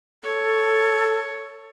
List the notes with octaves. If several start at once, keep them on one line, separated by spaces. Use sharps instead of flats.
A4 C#5